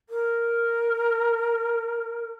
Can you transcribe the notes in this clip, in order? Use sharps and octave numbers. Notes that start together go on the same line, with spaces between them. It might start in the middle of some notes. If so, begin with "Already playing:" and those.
A#4